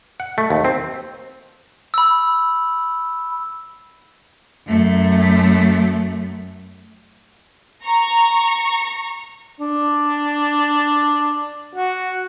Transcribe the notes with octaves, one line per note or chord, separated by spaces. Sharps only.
F#5
A3
D#2
C4
B5 E6
F#2 A3
A#5 C#6
D4
F#4